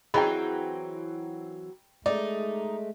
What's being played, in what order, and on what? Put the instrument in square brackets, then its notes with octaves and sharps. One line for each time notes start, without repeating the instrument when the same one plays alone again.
[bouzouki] E3 F#3 C4 [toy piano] G#4 D#5 [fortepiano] G5 A#5 B5
[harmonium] G#3 A3 [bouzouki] D#4 [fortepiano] D5